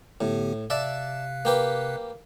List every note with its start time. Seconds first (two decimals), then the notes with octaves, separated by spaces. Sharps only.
0.21 A2 D3 B3 G4
0.70 C3 D5 E5 F5 A5 F#6
1.45 A#3 G4 B4